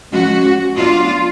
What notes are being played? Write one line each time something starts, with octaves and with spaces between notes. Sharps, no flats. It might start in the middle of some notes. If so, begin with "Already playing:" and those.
F3 G#3 C#4 F#4
F#3 B3 D4 F4